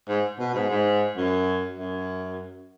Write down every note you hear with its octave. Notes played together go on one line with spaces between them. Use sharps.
G#2
B2
G#2
G#2
F#2
F#2